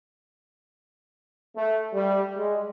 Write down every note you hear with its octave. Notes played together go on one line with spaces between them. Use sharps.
A3
G3
G#3